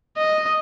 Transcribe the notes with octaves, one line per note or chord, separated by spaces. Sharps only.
D#5